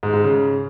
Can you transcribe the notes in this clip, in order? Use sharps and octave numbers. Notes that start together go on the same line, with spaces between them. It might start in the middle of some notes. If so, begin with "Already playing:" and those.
G#2
G#2
C#3